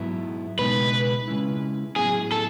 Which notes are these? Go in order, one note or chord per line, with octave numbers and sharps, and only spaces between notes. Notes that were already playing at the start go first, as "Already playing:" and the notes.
Already playing: G#2 F#3 B3 E4
C#2 B2 G#3 B3 D#4 B4
C#3 G#3 C#4 E4
A2 F#3 B3 E4 G#4
A4